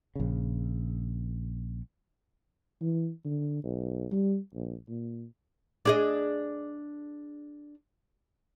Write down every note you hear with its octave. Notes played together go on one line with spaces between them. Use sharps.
A#1 C#3
E3
D3
B1
G3
A#1
A#2
D4 G#4 D#5